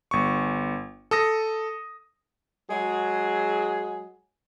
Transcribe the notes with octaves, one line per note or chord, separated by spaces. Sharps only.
G1 C#6
A4 D#6 A#6
F#3 G#3 G#4